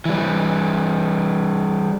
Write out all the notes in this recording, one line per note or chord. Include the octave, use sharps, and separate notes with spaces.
E3 G3